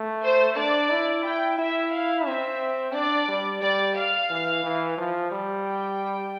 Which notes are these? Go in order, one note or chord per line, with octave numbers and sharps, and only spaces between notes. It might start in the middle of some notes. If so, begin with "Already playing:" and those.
Already playing: A3
C5
D4 D5
E4
E4 G5
E4 E5
F5
C4 E5
D4 D5
G3
G3 D5
F5
E3
E3
F3
G3
G5